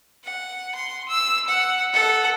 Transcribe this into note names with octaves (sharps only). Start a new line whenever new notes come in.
F#5
C6
E6
F#5
A4 F#5